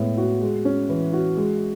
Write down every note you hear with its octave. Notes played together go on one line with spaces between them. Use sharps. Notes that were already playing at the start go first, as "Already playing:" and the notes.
Already playing: A2 G#3 B3
F#4
G#3
C#4
E3
F#4
G#3